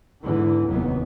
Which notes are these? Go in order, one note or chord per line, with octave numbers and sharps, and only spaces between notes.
E2 G#2 D3 E3
F1 D#2 F#3 B3